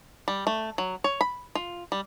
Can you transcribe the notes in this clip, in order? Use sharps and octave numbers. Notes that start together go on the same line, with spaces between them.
G3
A3
F#3
C#5
B5
F4
G3